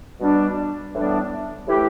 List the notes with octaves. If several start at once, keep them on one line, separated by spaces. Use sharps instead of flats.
B2 G3 D4
A2 E3 G3 B3 D4
A2 E3 A3 E4 G4